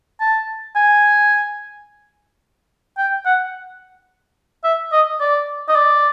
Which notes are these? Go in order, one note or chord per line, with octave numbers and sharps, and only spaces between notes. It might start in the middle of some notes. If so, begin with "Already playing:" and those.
A5
G#5
G5
F#5
E5
D#5
D5
D#5
D5